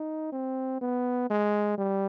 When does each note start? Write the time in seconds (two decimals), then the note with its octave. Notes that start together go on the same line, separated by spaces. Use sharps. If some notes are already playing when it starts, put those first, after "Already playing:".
Already playing: D#4
0.32 C4
0.81 B3
1.30 G#3
1.78 G3